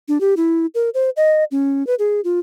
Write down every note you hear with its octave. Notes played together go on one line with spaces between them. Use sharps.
D4
G4
E4
A#4
C5
D#5
C#4
B4
G#4
F4